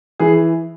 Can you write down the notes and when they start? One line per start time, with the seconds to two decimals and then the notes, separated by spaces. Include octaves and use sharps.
0.20 E3 G#4